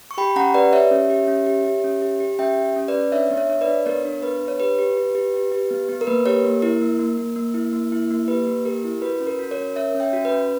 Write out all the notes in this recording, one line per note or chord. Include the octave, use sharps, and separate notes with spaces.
C#6
G4 G5 B5
C#4 F#5 A#5
G4 B4 D5
G4 C#5 E5
C#4
G4
C#4
G4
G4
C#4
G4
G4
C#4 E5 G5
G4
C#4
B4 D5
C#4
D4 C#5 E5
B3
C#5 E5
D4 C#5
B4 D5
D4
B3 A#4 C#5
D4
B3 B4
D4
C#5
G4 B4
G4
G4
G4
G4
G4
B3
B3
A#4
A#3 B4
G4 A#4 C#5
A#3
E4 A#4
A#3
A#3
A#3
A#3
E4
A#3
E4
A#3
G4 B4
A#3
G4 A#4
E4
F#4 B4
C#4
A#4
F#4
A#4 C#5
C#4
C#4 C#5 E5
C#4
E5 G5
F#4
B4
C#4